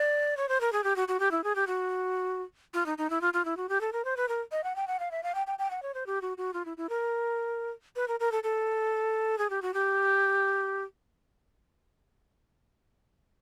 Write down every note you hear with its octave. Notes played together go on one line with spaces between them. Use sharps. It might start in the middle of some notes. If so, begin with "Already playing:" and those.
Already playing: D5
C#5
C5
A#4
G#4
G4
F#4
F#4
G4
E4
G#4
G4
F#4
F4
D#4
D#4
E4
F4
F4
E4
F#4
G4
A4
A#4
C5
B4
A#4
D#5
F#5
G5
F#5
F5
E5
F5
G5
G5
G5
F#5
C#5
C5
G4
F#4
F#4
F4
E4
E4
A#4
B4
A#4
A#4
A4
A4
G#4
G4
F#4
G4